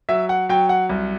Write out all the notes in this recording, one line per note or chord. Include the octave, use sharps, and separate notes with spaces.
F#3 E5
F#5
F#3 G5
F#5
C2